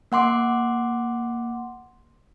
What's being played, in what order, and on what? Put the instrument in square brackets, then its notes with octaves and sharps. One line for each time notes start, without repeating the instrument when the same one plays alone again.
[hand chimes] A#3 F#5 C6 D6